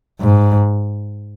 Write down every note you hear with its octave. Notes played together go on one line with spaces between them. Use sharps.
G#2